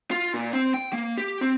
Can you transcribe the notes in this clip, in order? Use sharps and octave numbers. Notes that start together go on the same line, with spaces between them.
F4
A#2
C4
G5
A#3
G4
C4